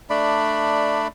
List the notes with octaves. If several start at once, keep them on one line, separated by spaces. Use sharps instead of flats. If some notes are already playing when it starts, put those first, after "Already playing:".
A3 D4 D5 B5